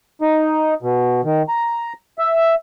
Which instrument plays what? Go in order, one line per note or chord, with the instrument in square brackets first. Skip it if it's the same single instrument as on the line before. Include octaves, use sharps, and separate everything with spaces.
[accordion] D#4
B2
D#3
A#5
E5